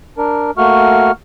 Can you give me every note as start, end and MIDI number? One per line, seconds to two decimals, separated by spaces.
0.18 0.51 62
0.18 0.51 70
0.58 1.11 57
0.58 1.11 58
0.58 1.11 66
0.58 1.11 85
0.58 1.11 89